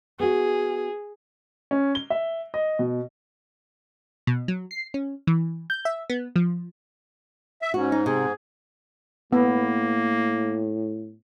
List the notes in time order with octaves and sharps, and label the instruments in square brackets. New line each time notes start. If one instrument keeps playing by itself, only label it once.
[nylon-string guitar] B3 F#4 [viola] G#4
[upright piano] C#4
G7
E5
D#5
B2
[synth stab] B2
F#3
C7
C#4
E3
G6
E5
B3
F3
[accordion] E5
[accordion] G#2 [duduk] C#4 [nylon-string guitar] F#4
[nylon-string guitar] D#4
[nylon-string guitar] C3 [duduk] G#4
[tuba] A2 [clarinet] A#3 [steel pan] B3